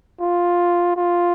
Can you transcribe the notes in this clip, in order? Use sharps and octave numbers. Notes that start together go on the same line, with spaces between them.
F4
F4